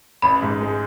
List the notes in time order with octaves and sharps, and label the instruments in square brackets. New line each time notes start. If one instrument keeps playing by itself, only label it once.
[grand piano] A1 [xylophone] B5
[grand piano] G#2
G#3